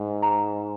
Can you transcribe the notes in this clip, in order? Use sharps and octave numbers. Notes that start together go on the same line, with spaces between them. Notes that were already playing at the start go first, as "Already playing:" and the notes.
Already playing: G#2
A#5